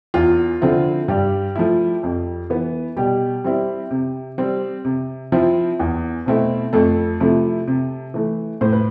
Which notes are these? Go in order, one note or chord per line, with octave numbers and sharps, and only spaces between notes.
E2 F4
D3 F3 C4 E4
G2 G3 G4
F3 A3 E4
F2
E3 B3
B2 G3 G4
G3 C4 E4
C3
G3 C4
C3
F3 C4 E4
E2
B2 A3 C4 E4
F2 A3 A4
C3 F3 A3 E4
C3
E3 A3
A2 C5
B4